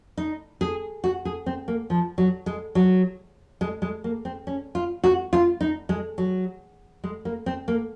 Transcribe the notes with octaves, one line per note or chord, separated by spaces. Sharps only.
D#4
G#4
F#4
G#4
C4
A#3
F3
F#3
G#3
F#3
G#3
G#3
A#3
C4
C#4
F4
F#4
F4
D#4
G#3
F#3
G#3
A#3
C4
A#3